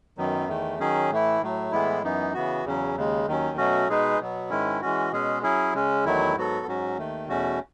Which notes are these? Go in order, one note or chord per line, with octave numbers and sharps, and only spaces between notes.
F#2 D#3 F#3 B3
E2 D#3 A3
D#3 F#3 C#4 G#4
A2 E3 A3 E4
A2 F#3 A3
A2 E3 G#3 B3 E4
F#2 E3 B3 D#4
C#3 E3 B3 F#4
E2 C#3 F#3 C#4
D#2 C#3 G#3
D#2 D#3 F#3 C#4
B2 F#3 A3 C#4 F#4
B2 G#3 D#4 G#4 B4
B2 F#3 B3
G#2 D#3 G#3 C#4 E4
E3 G#3 C#4 F#4
B2 G#3 C#4 G#4
F#3 C#4 E4 G#4
C#3 G#3 C#4
E2 D#3 F#3 A3 E4
G#2 F#3 B3 F#4 A4
G#2 F#3 C#4 F#4
D#2 D#3 A3
E2 B2 A3 C#4 F#4